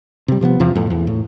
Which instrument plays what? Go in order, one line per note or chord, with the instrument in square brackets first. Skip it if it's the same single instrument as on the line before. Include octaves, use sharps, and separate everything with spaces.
[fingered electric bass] C3 G3
C3 F3 A3 B3
E2 C3 F3
F2 A2
E2
A2